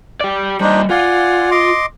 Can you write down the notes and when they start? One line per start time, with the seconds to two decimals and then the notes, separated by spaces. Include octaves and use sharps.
0.21 G4 D5
0.60 G3 D4 D#4 C5 D#5
0.90 F4 D5 F#5 G#5
1.51 D#5 C6 D6